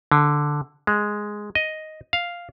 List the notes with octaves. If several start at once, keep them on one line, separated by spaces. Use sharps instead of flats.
D3
G#3
D#5
F5